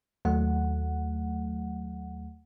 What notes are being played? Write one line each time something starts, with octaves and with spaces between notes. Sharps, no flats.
D#2 F#3 A3 F#5